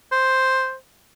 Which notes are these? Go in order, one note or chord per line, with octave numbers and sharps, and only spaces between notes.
C5